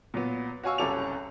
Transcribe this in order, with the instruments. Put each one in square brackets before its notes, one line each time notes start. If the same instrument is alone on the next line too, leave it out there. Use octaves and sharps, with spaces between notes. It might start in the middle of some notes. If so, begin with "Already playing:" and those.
[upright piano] A#2 F#3 B3
F#4 C#5 F5 G#5 C#6 E6
F#1 C2 C#4 A4 D6 F7